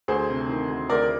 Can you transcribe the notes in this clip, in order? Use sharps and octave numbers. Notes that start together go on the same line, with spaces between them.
D2 G#4 C5
C3
D#3
D2
D2 A#4 D5